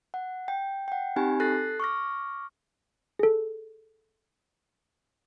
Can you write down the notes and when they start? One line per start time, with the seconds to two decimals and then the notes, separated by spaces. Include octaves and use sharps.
0.14 F#5
0.48 G5
0.88 F#5 G5
1.16 C4 D#4 G4 G#5 B5
1.40 A4 F#6 A6 A#6 C7
1.80 C#6 D6 F6 A#6
3.19 G#4 A4